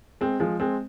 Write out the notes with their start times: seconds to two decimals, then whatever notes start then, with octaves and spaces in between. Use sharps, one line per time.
0.21 G#3 C4
0.40 F3 G#3
0.60 G#3 C4